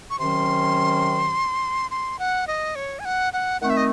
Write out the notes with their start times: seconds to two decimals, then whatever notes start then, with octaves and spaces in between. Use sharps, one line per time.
0.10 C#6
0.19 C3 D#3 F#3 C#4 C6
1.91 C6
2.19 F#5
2.47 D#5
2.75 C#5
2.99 G#5
3.05 F#5
3.33 F#5
3.61 D#3 A3 C4 F#5
3.70 E5
3.77 D#5